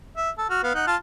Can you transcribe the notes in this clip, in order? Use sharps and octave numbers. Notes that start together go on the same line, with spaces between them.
E5
A4
F#4 F6
B3 F5
D#4 F#5
F4 A5 F6